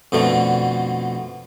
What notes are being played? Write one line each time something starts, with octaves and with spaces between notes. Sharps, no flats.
F2 B2 D3 A3